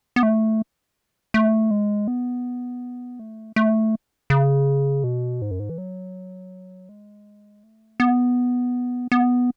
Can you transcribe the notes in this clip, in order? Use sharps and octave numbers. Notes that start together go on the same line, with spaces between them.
B3
A3
A3
G#3
B3
A3
A3
C#3
B2
G#2
F#2
G#2
E3
F#3
G#3
A3
B3
B3